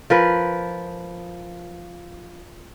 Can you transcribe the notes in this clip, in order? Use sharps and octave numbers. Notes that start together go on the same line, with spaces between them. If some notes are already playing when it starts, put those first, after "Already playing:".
F3 A#4 B4